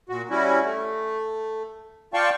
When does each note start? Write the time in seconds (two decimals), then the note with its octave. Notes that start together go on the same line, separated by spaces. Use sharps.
0.09 A#2 F#4
0.30 G3 C#4 E4 F#4
0.63 A3
2.14 F4 D5 F5 G5 A5 C#6